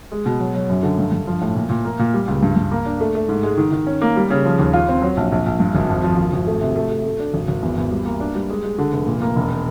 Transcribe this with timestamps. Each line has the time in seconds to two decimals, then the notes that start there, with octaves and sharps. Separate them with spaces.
0.12 G#3
0.26 B2
0.40 F#3
0.55 F#3
0.69 F#2
0.83 D3
0.98 G2
1.12 G2
1.27 F3
1.41 A2
1.55 A#2
1.69 A#2
1.85 A#3
1.99 A#2
2.14 G3
2.28 C#2
2.43 G2
2.56 G2
2.71 A#3
2.86 D4
3.00 A3
3.15 A3
3.29 G#2
3.43 G#3
3.57 D#3
3.72 D#3
3.87 C#4
4.02 A#3
4.16 G3
4.30 C#3
4.45 F3
4.59 D#2
4.73 F4
4.89 C4
5.02 F#3
5.17 A#1
5.32 A#1
5.46 A#1
5.60 G2
5.75 G#1
5.89 F2
6.04 F3
6.18 G#1
6.32 G#1
6.47 A3
6.61 C3
6.76 A3
6.90 A3
7.05 A3
7.20 D4
7.34 G#1
7.48 G#1
7.63 E2
7.78 E2
7.91 G3
8.05 A#3
8.20 D4
8.35 G3
8.50 G#3
8.64 G#3
8.79 D3
8.92 F1
9.07 A#2
9.22 A#3
9.36 E1